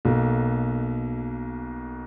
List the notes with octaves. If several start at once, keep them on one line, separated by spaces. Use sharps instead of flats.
B1 B2 A#3